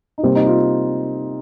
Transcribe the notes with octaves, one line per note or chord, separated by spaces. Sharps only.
D#4
C3 G3 A#3 C4
D#4
F4